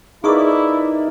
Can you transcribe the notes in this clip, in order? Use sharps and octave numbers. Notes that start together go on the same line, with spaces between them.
A#3 D#4 E4 G#4 B4 D5 C#6 D#6